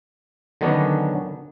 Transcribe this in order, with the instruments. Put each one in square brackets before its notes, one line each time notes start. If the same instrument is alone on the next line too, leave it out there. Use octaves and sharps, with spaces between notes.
[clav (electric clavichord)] D3 D#3 F#3 B3 C#4 D4